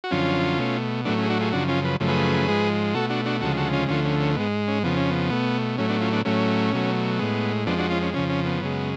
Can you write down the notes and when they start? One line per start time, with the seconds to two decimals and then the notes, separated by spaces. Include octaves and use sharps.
0.04 F#4
0.11 F#2 D3 F3 C#4 F4
0.59 B2 A3
1.05 A2 F#3 A3 B3 D4
1.18 C#4
1.24 G#4
1.30 D4 F#4
1.41 F4 G#4
1.52 F#2 C#3 F3 D4 F#4
1.68 C#4 F4
1.85 B4
2.00 F#2 C#3 F3 A3
2.08 G#4 B4
2.48 G#2 F3 G#3
2.94 B2 A3 F#4 A4
3.10 D4 F#4
3.26 D4 F#4
3.41 D2 C#3 F3 G#3 F#4 A4
3.57 F#4 A4
3.73 C#4 F4
3.88 D2 D3 F3 A3 C#4 F4
4.05 C#4
4.20 C#4
4.36 G#2 G#3 B3
4.68 C#4
4.83 F2 C#3 F3 B3
4.97 C#4
5.10 B3
5.31 B2 A3
5.78 A2 F#3 A3 C#4
5.89 B3 D4
6.01 C#4 F4
6.13 B3 D4
6.25 A2 F#3 A3 C#4
6.73 B2 F#3 A3
7.19 A2 G#3 B3
7.66 F2 F3 G#3 B3 D4
7.78 D4 F#4
7.90 C#4 F4
8.02 C#4
8.14 F2 C#3 F3 C#4
8.29 C#4
8.46 B3
8.61 F#2 C#3 G#3